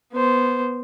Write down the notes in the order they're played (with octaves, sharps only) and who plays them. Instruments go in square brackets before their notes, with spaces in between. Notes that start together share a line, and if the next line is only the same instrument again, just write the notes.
[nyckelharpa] B3 C5